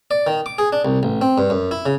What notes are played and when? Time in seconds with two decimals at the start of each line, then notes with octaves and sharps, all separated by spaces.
0.11 D5
0.27 D#3
0.46 D6
0.58 G#4
0.73 D4
0.85 C2
1.03 A1
1.21 C4
1.38 G2
1.50 F#2
1.71 E4
1.86 C#3